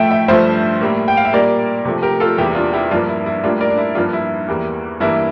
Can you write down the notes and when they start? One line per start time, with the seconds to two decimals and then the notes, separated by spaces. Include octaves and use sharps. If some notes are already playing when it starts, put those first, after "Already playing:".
Already playing: A2 F3 A3 E5 G5
0.11 E5 G5
0.28 G2 F3 A3 C5 E5
0.81 A2 G3 A#3
1.08 G5
1.17 F5
1.25 E5
1.33 A#2 G3 A#3 A#4 D5
1.85 C3 F3 A3
2.03 G4 A#4
2.20 F4 A4
2.38 E2 C3 G3 A#3 E4 G4
2.55 D4 F4
2.73 E4 G4
2.90 G2 F3 A#3 D4 F4
3.08 E4
3.26 E4
3.44 A2 G3 A#3 D4 F4
3.60 A#4 D5
3.70 D4
3.78 E4
3.95 G2 F3 A#3 D4 F4
4.13 E4
4.48 E2 E3 G3 A#3
5.00 G2 E3 G3 A#3 E4